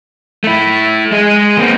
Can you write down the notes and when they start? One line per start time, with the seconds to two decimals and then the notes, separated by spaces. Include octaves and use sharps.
0.44 A3 E4
1.12 G#3 G#4
1.58 A#3 C4